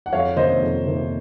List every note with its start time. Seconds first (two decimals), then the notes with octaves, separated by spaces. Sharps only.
0.06 F#5
0.13 F2 C#5 F5
0.36 C3 D#3 A#3 C5 D#5
0.61 F2
0.84 C3 D#3 A#3